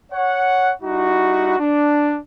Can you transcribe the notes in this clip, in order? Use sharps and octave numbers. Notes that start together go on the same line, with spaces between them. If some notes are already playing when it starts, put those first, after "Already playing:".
C#5 F#5
G3 D#4 E4 F#4
D4